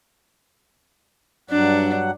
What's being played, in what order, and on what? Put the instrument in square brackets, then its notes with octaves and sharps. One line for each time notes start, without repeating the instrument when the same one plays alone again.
[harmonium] G2 F#3 F#5 [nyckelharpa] D4